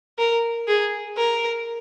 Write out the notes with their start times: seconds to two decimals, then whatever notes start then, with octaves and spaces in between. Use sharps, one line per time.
0.19 A#4
0.67 G#4
1.17 A#4